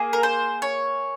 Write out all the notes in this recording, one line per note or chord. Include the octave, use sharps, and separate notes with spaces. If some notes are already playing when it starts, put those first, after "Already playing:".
Already playing: A#3 G#4
A#4
C5
C#5